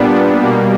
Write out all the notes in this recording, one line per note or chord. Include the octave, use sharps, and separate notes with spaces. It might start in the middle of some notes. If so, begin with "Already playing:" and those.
Already playing: A#2 G3 B3 D4
B2 G3 A#3